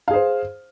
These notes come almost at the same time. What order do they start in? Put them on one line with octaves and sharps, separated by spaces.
F5 G#4 C5